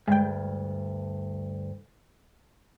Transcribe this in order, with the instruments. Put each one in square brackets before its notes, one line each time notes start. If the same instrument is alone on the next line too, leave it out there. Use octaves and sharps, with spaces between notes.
[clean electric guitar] D2 G2 [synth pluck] G#3 G5